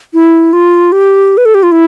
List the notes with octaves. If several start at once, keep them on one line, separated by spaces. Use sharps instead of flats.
E4
F4
G4
B4
A4
G4
F4
E4